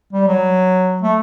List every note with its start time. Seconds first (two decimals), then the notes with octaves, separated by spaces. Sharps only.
0.13 G3
0.27 F#3
1.02 A3